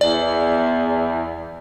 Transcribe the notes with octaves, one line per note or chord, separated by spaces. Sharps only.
E2 D5